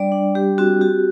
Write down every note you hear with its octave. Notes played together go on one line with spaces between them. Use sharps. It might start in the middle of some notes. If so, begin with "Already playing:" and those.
Already playing: G3 D4 D5
D4
G3 G4
C4 F#4
F#4 G4